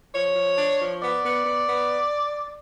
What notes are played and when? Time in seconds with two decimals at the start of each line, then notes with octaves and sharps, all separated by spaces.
0.14 F3 C#5
0.36 F3
0.58 D4
0.80 F3
1.02 B3 D5
1.23 B3
1.45 B3
1.67 B3